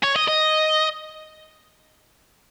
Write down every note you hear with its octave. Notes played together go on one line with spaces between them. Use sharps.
C#5
D#5
D#5